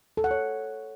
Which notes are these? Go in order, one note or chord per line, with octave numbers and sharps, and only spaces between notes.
A4
F#5
C#5